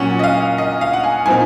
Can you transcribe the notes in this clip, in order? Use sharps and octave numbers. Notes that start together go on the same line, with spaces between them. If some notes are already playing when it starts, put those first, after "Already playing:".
Already playing: A#2 F#3 C#4 F#5
D#5
F5
D#5
F5
F#5
G#5
A#2 F3 C4 D#4 G#5